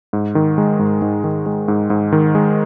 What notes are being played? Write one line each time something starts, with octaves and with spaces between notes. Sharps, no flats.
G#2
D#3
G#3
G#2
G#2
D#3
G#3
G#2
G#2
D#3
G#3